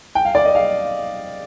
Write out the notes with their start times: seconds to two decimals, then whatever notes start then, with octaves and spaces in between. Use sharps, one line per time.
0.15 G5
0.25 F5
0.35 D5
0.45 D#5
0.55 F5